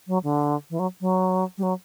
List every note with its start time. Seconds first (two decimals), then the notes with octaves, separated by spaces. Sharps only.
0.07 F#3
0.23 D3
0.70 E3
0.79 F#3
1.01 F#3
1.58 G3
1.63 F#3